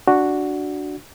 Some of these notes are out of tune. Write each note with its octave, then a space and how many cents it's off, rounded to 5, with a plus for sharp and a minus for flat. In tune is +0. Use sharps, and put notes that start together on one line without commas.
D4 +0 F#4 +0